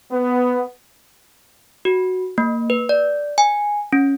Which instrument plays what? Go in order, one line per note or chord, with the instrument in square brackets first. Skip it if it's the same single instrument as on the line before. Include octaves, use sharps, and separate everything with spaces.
[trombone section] B3
[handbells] F#4
A#3
B4
D5
G#5
C#4